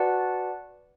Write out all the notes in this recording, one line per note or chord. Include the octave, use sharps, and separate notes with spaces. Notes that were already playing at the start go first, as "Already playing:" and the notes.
Already playing: F#4 B4 D5 F#5 A5